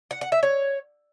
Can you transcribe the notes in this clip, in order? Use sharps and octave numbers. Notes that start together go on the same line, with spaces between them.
F#5
F#5
E5
C#5